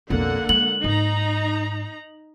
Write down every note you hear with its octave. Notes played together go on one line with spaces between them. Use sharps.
B1 F2 D3 A#3 F#5
G#3 F#7
G#2 D#4 A#5